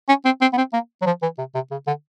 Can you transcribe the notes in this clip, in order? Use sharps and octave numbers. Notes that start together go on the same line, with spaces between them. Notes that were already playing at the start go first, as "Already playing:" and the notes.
C#4
C4
C4
B3
C4
A#3
F#3
F3
E3
C3
C3
C#3
D3